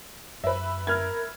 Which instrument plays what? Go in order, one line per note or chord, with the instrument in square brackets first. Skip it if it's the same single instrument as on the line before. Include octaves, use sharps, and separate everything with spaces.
[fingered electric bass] F#2 [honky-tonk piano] B4 E5
[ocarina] A#4 [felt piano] F6 G#6